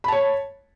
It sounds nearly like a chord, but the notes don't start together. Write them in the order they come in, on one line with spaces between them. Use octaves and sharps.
B5 A5 C#5